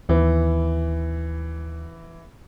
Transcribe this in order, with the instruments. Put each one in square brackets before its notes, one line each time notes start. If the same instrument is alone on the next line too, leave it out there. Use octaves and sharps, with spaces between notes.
[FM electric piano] D#2 [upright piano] E3 B3